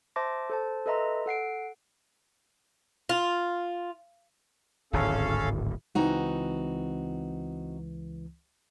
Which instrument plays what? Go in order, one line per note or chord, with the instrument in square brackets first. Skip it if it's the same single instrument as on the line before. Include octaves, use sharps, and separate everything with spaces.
[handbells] C5 E5 A5 C6 D6 A#6
A4 C5 A5
A4 B4 D#5 E5 A#5 C6
A4 F#5 C7 D7
[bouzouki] F4
[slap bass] D1 G#1 E2 [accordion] C#4 A4 F5
[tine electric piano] C#2 E3 [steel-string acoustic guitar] C4 D#4 F#4